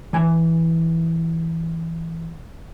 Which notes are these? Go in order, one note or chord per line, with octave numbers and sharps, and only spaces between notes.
E3 G#5